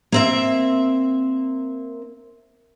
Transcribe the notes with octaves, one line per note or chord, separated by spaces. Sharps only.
A#3 C4 E5